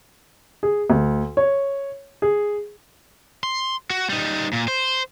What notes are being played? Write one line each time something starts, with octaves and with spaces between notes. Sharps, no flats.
G#4
D2
C#5
G#4
C6
F#4
G3 D#4
A#2
C5